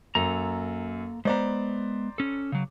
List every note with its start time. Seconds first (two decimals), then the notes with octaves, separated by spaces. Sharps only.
0.15 F#2 A#3 A4 A#5
1.25 G#3 B3 C5 D5 A#5
2.18 C#4 A4
2.52 C#3 F#3